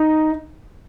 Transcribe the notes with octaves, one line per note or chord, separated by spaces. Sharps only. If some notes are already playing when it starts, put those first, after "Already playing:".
Already playing: D#4